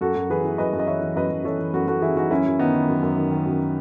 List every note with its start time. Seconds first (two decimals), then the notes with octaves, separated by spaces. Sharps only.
0.01 F#2 F#4 A4
0.15 F#2
0.30 E3 G#4 B4
0.44 E3
0.58 F#2 B4 D#5
0.73 F#2
0.79 D#5
0.87 E3 C#5 E5
1.01 E3
1.15 F#2 B4 D#5
1.31 F#2
1.44 E3 A4 C#5
1.59 E3
1.73 F#2 F#4 A4
1.87 F#2 F#4 A4
2.02 E3 E4 G#4
2.16 E3 D#4 F#4
2.30 F#2 C#4 E4
2.46 F#2
2.59 D#3 B3 D#4
2.74 D#3
2.88 F#2
3.02 F#2
3.17 D#3
3.31 D#3
3.46 F#2